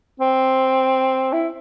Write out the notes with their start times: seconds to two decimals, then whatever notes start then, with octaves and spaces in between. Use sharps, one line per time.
0.20 C4
1.33 E4